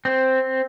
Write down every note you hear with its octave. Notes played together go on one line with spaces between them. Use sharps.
C4